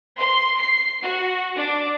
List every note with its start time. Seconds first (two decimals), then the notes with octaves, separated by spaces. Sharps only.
0.17 C6
0.59 C7
1.02 F#4
1.56 D4